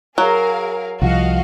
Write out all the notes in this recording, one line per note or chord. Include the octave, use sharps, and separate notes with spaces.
F#3 G#4 A#4 F5
C2 F3 F#4 D#5 F5